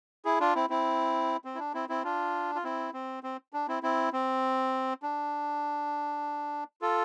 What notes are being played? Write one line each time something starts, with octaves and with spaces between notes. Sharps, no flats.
E4 G#4
D4 F4
C4 E4
C4 E4
C4
E4
D4
C4 E4
C4 E4
D4 F4
F4
C4 E4
C4
C4
D4
C4 E4
C4 E4
C4
D4
F4 A4